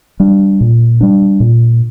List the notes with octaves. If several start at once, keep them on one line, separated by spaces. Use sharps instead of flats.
G3 D4
A#2
G3 D4
A#2